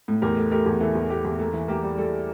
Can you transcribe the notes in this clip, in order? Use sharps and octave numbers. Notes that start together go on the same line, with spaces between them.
A2
E2 G4 A#4
A3
A3 G4 A#4
E2
E3 A4
E2
A3 G4
E2
A#3 A4
E3
A#3 G4
G3
G3 A4